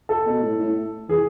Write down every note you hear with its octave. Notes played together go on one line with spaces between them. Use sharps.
A4
B2
A2
A2
E3 G#4